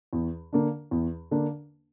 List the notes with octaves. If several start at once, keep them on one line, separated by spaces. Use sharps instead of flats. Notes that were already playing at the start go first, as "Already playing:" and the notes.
E2
D3 A#3 D4
E2
D3 A#3 D4